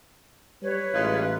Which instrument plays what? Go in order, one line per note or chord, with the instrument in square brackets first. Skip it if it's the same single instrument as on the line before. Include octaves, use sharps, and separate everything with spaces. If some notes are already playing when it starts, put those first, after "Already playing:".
[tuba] G3 [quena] B4 [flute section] C#5
[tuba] A1 [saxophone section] G#3 D#4 F4